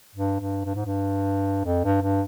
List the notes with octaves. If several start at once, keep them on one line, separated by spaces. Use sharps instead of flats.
G2
G2
G2
G#2
G2
F2
G2
G2